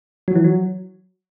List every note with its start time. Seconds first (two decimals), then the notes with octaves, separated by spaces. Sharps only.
0.28 F#3
0.35 E3
0.44 F#3